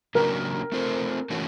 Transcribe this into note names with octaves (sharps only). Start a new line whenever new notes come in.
C#3 F#3 A#3 D4 G4 A#4
A3 C4 F4 A4 C5
E3 A3 C#4 F#4